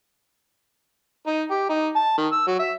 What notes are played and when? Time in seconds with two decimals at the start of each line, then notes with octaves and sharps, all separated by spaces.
1.27 D#4
1.50 G4
1.69 D#4
1.96 A5
2.17 D#3
2.32 E6
2.47 F#3
2.59 E5